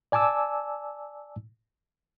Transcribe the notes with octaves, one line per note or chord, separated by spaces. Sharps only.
D5 G#5 A5 D6 E6